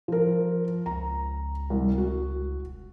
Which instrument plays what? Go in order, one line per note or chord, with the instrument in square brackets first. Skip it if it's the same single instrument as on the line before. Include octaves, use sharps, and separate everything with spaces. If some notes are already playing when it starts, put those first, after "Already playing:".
[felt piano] F3 A#4
[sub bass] C#2 [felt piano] A#5
[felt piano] C2
F#4
[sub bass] E1